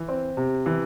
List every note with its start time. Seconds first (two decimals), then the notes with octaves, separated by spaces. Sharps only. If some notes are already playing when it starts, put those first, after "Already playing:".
Already playing: E3
0.08 C4
0.37 C3
0.66 E3